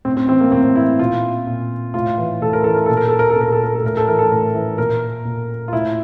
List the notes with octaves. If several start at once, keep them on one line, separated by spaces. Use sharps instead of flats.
A2 C4
C4
E3 C4
A#3
A2 C4
E3 E4
A#2 F4
A#2
A2 F4
E3
A2 A4
A#4
E3 A4
A#4
A#2 A4
A#4
A4
A#4
A4
A#2
A#4
A4
A#4
A4
A2 A#4
A4
E3 A#4
A4
A2 A#4
E3
A#2 A#4
A#2
F4
A2 E4